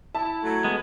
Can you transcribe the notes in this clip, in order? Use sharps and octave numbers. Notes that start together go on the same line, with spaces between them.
E4 A5
F#3 A3
G#3 B3